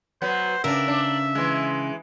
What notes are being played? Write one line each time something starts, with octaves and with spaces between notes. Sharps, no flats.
F#3 B3 C5
C#3 D4 A#4 E5
D4
E3 G#3